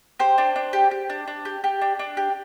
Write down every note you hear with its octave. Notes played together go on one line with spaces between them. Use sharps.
G4 C5
D4
D4
G4
G4
D4
D4
G4
G4
D4
D4
G4